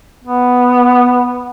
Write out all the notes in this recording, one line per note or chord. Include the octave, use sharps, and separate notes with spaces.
B3